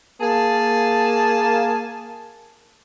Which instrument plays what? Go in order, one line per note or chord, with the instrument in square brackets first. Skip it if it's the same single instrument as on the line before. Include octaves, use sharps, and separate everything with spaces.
[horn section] A#3 G#4 A5